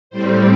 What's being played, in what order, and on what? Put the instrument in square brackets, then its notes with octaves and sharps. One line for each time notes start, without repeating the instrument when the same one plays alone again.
[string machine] A2 G3 C4 C5